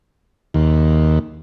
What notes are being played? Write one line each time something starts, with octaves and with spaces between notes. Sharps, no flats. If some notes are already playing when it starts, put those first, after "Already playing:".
D#2